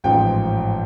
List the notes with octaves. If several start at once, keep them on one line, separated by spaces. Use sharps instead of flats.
A1 G#2 F3 G5